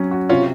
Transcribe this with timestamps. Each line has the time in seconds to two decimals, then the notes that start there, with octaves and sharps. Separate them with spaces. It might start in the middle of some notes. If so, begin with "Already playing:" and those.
Already playing: F#3 C#4
0.11 F#4
0.29 C3 C#4 F4